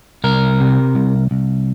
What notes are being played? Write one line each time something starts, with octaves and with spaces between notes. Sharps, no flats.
C2 A#4
C3
C2
C2